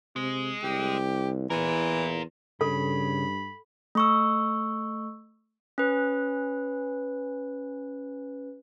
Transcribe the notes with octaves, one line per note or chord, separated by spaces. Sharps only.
C3 G#3
C2 G4
E2 E3 F4 A#4
G2 C#3 A4 B5
A3 C#6 E6
C#4 B4